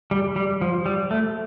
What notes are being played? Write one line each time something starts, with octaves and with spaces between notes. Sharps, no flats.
G3
G3
F3
G3
A3